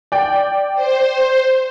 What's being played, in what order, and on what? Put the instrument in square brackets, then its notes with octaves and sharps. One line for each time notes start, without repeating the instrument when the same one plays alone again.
[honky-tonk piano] D5 G5
[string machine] C5